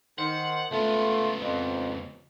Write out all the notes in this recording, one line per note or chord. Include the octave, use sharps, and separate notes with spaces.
D#3 C5 F#5
C#2 A3 B3 F4
F2